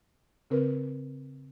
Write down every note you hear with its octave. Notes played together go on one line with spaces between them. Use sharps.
C#3 C4 A#4 B4